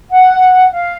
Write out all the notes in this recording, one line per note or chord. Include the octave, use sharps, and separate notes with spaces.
F#5
F5